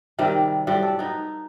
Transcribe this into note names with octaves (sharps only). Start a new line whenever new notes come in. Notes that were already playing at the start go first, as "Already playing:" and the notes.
C3 D#3 G3 C4
A2 G3 F#4
A4
B3 D#4